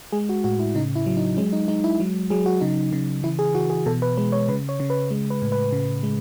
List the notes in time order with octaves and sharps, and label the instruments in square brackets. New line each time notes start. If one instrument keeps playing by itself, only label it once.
[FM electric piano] G#3 G#4
F#4
A2 F#4
E4
C#3 D#4
E4
F#3
D#4
G#3 C#4
D#4
G#3 D#4
E4
F#3
F#3 G#4
F#4
C#3 D#4
C#3
E3 E4
G#4
E3 F#4
G#4
B2 A4
B4
G#3 B4
C#5
C#3 B4
C#5
C#3
B4
G#3
B4
A2
B4
C#3
G#3